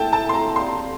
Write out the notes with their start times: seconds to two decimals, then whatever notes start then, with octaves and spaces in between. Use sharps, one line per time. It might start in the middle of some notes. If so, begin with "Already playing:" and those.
Already playing: E4 A4 E5 G5 A5
0.13 A5
0.29 C6
0.34 A#5
0.56 C4 G4 D5 F5 C6